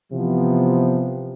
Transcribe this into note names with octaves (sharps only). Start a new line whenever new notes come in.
C3 E3 F3 B3